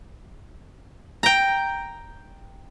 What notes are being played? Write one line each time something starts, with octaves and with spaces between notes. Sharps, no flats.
G5 A#5